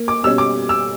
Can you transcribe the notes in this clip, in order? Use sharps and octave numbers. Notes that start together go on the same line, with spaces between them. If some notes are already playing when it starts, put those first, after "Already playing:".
Already playing: A#3
D6
B2 G3 C#4 E6
D6
E6